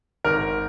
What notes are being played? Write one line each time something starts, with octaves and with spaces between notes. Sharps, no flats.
G#1 A#4